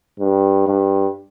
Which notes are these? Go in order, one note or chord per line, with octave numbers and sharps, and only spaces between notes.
G2
G2